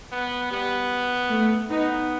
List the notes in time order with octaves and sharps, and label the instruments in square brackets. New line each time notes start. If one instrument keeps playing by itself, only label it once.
[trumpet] B3
[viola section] G3 [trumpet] B3
[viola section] A3
[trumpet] B3 [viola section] D#4